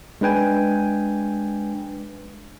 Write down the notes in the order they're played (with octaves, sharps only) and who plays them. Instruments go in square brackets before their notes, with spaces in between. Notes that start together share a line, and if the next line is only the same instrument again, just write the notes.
[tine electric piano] G#3 D4 B4 G5 G#5